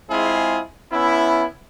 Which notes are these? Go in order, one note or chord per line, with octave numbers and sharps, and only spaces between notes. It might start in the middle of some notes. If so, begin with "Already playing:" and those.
G#3 C4 E4 F4 G#4
B3 C#4 E4